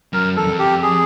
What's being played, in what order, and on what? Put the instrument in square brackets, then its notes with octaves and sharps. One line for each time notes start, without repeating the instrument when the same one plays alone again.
[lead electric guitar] F#2 [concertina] A#4
[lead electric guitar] E2 [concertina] A4
[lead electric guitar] F2
[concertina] G4
G#4